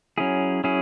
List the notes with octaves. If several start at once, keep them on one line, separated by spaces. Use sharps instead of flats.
F#3 C#4 E4 G#4
F#3 C#4 E4 G#4